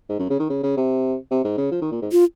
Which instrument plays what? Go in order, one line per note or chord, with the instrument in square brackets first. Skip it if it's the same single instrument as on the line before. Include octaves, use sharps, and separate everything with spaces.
[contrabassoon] G#2
F#2
C#3
D#3
C#3
C#3
C3
C3
G#2
C#3
F3
D#3
A#2
G#2
[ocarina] F4